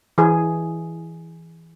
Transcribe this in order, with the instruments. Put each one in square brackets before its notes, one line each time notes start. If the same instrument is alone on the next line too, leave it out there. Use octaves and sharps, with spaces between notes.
[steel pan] E3 G#4